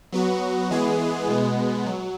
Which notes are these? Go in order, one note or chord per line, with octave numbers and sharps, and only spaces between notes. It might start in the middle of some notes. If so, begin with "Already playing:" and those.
F#3 B3 F#4
E3 G#3 B3 G#4
B2 G#3 B3
F#3